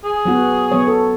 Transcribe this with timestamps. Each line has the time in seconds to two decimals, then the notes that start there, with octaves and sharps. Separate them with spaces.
0.05 G#4
0.25 F#3 B3 F#4
0.71 F#3 B3 C#5
0.87 A4